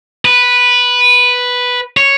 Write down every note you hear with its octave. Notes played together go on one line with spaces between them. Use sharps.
B4
C#5